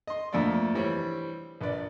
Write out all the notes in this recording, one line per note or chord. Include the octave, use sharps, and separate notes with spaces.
D#5 C6
F2 A3 A#3 D4 D5
E3 G3 C4 C#5
A#1 B4 D5